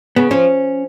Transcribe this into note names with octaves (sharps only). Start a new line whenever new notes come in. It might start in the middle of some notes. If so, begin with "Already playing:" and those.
C#3 B3
F3 C#4